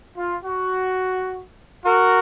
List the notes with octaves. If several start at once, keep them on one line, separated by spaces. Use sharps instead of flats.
F4
F#4
F#4 A#4